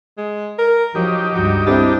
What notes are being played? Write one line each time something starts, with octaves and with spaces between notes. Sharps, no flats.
G#3
A#4
F3 F#3 D#4 G4
C#2 G2 F#4
G3 C4 D4 E4